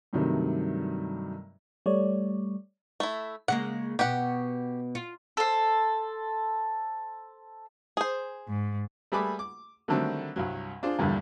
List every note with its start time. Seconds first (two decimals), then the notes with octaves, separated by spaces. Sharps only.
0.13 G2 C3 D#3 F#3 G3 A3
1.86 G3 A3 C#5 D5
3.00 A3 E4
3.48 C#3 G#3 A#3 F#5
3.99 B2 B3 G4 F#5
4.95 F4
5.37 A4 C5
7.97 G#4 C5
8.48 G#2
9.12 G3 A3 G#4 B4 B5 D6
9.39 D6
9.88 D3 D#3 F#3 G3 A3 C4
10.36 C2 G2 F#3
10.83 D4 F4 G#4 C5
10.99 E2 G2 A#2 D3 F3 G3